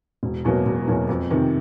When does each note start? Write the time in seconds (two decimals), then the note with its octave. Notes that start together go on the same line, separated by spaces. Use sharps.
0.23 E1
0.44 E2 B2 F#3 A#3
0.66 E1
0.87 E2 B2 F#3 A#3
1.09 F2
1.30 C3 D#3